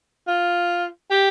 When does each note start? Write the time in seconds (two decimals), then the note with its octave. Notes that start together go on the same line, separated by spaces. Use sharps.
0.27 F4
1.10 G4